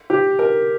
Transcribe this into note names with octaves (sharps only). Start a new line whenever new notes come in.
G4
A#4